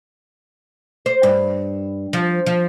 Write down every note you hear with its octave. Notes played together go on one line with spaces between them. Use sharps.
C5
G2
F3
F3